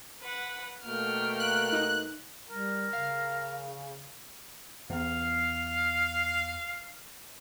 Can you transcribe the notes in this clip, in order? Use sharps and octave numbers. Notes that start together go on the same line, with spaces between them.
B4 F#5
B2 A3 A#3 G5 F6
F#6
D#4
G3 A#4
C#3 F5
E2 F5